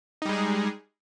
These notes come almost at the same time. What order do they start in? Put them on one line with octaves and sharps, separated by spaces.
D#4 G3 G#3 G#4